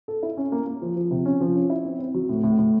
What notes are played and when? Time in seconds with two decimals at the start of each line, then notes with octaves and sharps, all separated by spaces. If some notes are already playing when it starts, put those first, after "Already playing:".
0.08 A4
0.23 E4
0.37 C#4
0.52 A#3
0.67 A#3
0.82 F3
0.96 F3
1.11 C3
1.25 C#4
1.41 F3
1.55 C#4
1.70 E4
1.85 C4
1.99 C4
2.14 F#3
2.29 A2
2.43 A2
2.59 A2